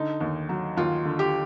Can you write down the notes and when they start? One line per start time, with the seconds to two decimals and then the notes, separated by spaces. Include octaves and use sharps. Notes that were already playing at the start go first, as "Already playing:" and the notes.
Already playing: D3 D#4
0.20 D#2
0.49 F#3
0.77 D#2 F4
1.05 D3
1.19 G4